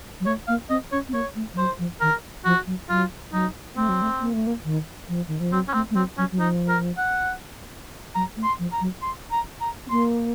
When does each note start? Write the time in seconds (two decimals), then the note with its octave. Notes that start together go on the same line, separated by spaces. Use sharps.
0.20 F#3
0.26 A3 C#5
0.48 A#3 F5
0.70 C4 D#5
0.92 C#4 C#5
1.08 C4
1.13 A#3 C#5
1.35 A3
1.54 F3
1.57 F#3 C5
1.79 F3
2.01 D#3 A#4
2.45 F3 F#4
2.66 F#3
2.89 F#3 F4
3.33 F#3 D#4
3.77 A3 C4
3.89 F#3
4.02 A3
4.21 A#3
4.34 A3
4.47 A#3
4.65 D#3
5.09 F3
5.28 D#3
5.40 F3
5.52 F#3 C4
5.68 C#4
5.74 A3 C4
5.91 A3
5.95 F#3 C4
6.18 F#3 C#4
6.32 F#3
6.39 F3 D#4
6.69 A#4
6.98 F#5
8.15 F#3 A#5
8.37 A3
8.44 C6
8.59 F3
8.73 A#5
8.81 F#3
9.02 C6
9.32 A#5
9.61 A#5
9.87 C4
9.90 A#3 C6